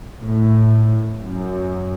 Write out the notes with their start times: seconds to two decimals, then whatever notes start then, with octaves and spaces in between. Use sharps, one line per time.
0.23 A2
1.22 F#2